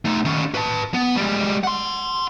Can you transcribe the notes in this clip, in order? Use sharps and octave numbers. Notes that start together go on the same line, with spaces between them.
A3 D#4
D#3 C#4
B4 A5
B3
G3 G#3
F#5 C6